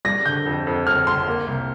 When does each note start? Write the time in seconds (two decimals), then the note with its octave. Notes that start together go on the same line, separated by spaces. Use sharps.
0.05 G3 A#6
0.25 D3 G6
0.46 F2
0.67 F2
0.87 G1 F6
1.07 G1 C6
1.28 A#3
1.48 C2